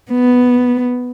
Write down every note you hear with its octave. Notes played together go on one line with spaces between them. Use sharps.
B3